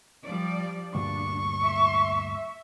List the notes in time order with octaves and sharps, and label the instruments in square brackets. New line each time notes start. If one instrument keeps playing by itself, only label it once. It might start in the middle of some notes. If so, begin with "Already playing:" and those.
[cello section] F3 G3 D5
[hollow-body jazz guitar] D2 G2 A#2 [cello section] D4 [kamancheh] C#6
[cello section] E5